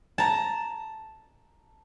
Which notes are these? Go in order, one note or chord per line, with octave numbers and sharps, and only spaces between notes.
A5 A#5